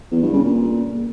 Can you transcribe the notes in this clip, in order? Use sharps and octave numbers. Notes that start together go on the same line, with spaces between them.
E2
G2
C#3
A#2